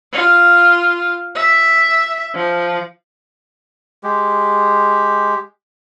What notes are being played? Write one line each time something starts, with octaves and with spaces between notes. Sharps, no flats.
F4
E5
F3
G#3 G4